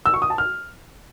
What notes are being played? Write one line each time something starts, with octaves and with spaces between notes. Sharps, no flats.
E6
C#6
D#6
A5
F6